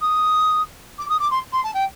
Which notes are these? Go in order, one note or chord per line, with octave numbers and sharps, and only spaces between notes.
D#6
D6
D#6
D6
C6
C6
A5
G5